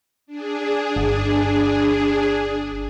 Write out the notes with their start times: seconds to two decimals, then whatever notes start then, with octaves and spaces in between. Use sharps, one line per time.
0.26 D4 G#4
0.96 G1